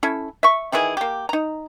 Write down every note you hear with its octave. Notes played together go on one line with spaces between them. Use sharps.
C#4 E4 A4
E5 C#6
D#3 E3 E4 G#4
A#3 G4
D#4 A#5